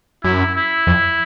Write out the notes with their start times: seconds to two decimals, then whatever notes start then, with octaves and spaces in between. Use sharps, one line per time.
0.24 F#2 E4
0.56 E4
0.87 F2